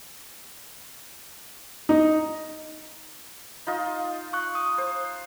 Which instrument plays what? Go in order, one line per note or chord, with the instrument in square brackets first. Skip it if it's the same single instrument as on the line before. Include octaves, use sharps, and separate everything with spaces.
[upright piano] D#4
[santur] D#4 F4 D#5
[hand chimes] C#6 F#6
D#6
[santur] C5